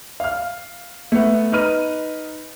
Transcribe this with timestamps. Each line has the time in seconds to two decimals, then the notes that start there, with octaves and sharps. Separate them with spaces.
0.20 F5 F6
1.12 A3 B3
1.52 D#4 B4 F6 D#7